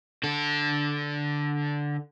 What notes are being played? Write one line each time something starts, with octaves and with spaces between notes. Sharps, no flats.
D3 A4